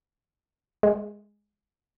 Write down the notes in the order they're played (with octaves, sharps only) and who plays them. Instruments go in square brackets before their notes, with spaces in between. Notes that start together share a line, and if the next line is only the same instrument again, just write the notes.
[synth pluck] G#3